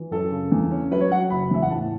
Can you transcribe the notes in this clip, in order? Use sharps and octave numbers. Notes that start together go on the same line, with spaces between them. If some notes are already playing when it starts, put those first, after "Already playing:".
Already playing: E3
F#2 A4
C#3
E2
C#4
F#3 B4
C#5
F#3 F#5
F#1 B5
E2 E5
F#5
A2 A5